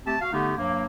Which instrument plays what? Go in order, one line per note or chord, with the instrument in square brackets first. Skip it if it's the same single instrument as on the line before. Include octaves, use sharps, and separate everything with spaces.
[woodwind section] A3 C4 G4 A5
F#4 F5
D3 A3 B3 D#4 G4
G2 F#3 A#3